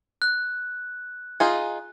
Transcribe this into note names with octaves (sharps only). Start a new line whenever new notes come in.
F#6
D#4 F4 G#4